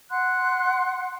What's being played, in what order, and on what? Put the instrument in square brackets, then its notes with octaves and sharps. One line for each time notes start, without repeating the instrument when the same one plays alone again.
[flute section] F#5 C6 F#6